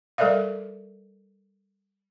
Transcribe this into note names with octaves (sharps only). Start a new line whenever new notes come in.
G3 A4 A#4 D5 E5 F5